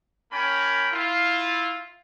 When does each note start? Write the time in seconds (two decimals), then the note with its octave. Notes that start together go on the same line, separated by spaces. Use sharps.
0.32 A#3 C#4 A#4 G5 B5
0.92 E4 F4